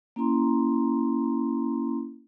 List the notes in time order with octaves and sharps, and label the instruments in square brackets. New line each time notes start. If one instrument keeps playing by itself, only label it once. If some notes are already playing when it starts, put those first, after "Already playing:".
[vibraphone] A#3 C#4 E4 A#5 C6